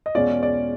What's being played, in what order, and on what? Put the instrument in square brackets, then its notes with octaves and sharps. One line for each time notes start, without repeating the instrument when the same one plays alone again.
[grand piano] D#5
[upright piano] E2 B2 G#3 C#4 F4 [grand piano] D5
[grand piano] D5